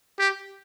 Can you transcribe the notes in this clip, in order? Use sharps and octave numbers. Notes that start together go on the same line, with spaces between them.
G4